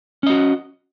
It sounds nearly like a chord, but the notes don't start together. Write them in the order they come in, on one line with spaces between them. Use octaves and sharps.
C#4 D#5 F#4